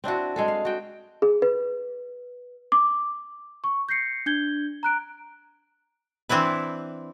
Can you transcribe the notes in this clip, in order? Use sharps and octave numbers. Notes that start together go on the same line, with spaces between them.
C4 D4 E4 F#4
G#3 G#4 A4
F5
F#4 G5
G#4
B4
D6
C#6
G6 A#6 C7 C#7
D4 G6 G#6 G7
A#5 F#6 D7
E3 C4 D4 E4 B4